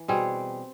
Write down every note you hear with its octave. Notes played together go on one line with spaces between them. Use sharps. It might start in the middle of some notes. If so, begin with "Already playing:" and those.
Already playing: E3
B2 G3 C4 G#4